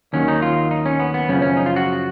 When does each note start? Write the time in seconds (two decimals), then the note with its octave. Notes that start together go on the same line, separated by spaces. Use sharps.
0.13 D#2 D#3 F#3 C#4
0.28 D#4
0.42 F4
0.71 D#4
0.86 C#4
1.00 B3
1.14 B3
1.28 F#2 C#3 F3 C#4
1.42 C#4
1.57 D#4
1.66 F4
1.76 F#4